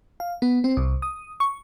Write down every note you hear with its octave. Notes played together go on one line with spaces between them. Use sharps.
F5
B3
C4
C2
D#6
C#6